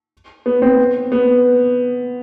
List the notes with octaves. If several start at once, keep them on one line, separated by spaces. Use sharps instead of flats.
B3
C4
B3